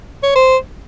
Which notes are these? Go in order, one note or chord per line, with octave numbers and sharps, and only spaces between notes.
C#5
C5